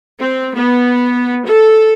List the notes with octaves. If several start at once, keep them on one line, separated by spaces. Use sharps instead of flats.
C4
B3
A4